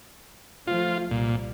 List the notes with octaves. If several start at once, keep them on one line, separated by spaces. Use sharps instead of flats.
F3 A3 F4
C2 A#2 G3